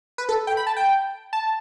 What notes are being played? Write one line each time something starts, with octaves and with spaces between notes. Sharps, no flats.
B4
A4
G5
B5
A5
G5
A5